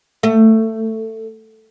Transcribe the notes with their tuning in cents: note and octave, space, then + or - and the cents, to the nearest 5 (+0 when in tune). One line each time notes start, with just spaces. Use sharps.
A3 +15